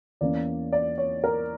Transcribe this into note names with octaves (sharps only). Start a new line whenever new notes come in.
E2 E3 A#3 C#4 D5
D5
C#5
A#4